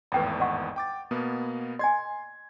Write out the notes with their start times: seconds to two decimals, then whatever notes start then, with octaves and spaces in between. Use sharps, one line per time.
0.12 G#1 E2 A2 B4 G5 B5
0.40 D#5 F#5 C#6
0.76 G5 D6 A6
1.11 B2 A#3 B3
1.79 D#5 G#5 C6 G#6